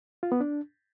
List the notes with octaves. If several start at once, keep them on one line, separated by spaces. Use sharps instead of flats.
F4
B3
D4